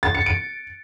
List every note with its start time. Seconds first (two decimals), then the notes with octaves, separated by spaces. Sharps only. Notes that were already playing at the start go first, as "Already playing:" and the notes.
0.03 A6
0.15 C#7
0.26 D7